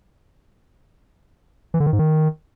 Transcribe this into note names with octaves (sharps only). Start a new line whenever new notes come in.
E3
D3
D#3
G#2
D#3